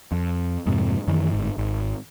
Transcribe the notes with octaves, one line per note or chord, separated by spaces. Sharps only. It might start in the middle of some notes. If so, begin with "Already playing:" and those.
F2
F2 G#2 C3
F#2 D#3 E3
G1 G#2
G#1